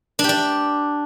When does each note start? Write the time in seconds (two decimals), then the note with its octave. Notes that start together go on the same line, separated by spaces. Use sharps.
0.19 D4
0.24 G4
0.29 D4